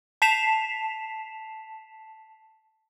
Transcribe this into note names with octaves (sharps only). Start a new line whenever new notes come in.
A5 B6 C7 E7 F7